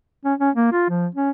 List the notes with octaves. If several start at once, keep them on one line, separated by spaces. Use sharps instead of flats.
C#4
C#4
A#3
F4
F3
C#4